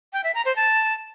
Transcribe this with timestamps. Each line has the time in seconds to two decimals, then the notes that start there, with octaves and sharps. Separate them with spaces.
0.13 G5
0.24 E5
0.35 A#5
0.45 C5
0.56 A5